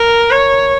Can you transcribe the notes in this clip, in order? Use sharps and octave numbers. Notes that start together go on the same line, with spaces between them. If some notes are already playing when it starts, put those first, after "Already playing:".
Already playing: A#4
C#5